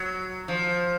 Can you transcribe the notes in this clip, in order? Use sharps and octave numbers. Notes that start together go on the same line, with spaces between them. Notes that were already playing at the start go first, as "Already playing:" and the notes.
Already playing: F#3
F3